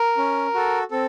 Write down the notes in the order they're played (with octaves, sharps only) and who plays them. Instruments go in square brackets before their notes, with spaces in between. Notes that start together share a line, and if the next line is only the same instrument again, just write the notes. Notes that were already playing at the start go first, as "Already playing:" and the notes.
Already playing: [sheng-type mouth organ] A#4
C#4
F#4 A4
C4 A4